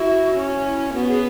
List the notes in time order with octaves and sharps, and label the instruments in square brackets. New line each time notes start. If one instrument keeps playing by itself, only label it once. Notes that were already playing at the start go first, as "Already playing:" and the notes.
Already playing: [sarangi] E4 [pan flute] F#4
[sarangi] C#4
[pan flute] E4
[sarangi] B3 [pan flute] F#4
[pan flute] G#4